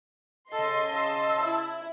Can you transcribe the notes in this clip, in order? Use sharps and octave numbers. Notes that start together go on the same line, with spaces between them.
C#3 A4 D#5 C6
A5 E6
E4